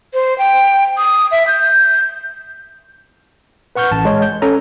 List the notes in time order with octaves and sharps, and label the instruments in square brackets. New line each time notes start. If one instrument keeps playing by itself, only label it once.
[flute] C5
G5
D#6
E5
G6
[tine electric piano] B4 F#5 C#6 F6 G6
A1 A5
G#3 G#4 C#5
G6
C#4 A4 G#5 A#5